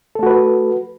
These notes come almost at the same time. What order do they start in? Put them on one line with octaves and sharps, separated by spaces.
A4 A3 F#4 B4